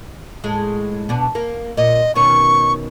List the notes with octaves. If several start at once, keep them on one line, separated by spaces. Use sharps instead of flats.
A2 G#3
B2 D4
A#3
A#2 D#5
B2 D#3 C#4 C#6